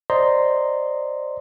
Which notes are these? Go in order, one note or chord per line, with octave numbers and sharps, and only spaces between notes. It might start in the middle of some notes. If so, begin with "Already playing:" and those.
C5 D5 D#5 A#5 C6